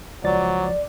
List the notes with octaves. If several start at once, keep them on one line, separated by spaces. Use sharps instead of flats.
C#2 F3 F#3 D5 A6